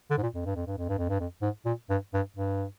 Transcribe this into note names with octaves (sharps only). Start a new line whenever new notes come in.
D3
G#2
A#2
F2
G2
F2
G2
F2
G2
F2
G2
F2
G#2
A#2
G2
G2
G2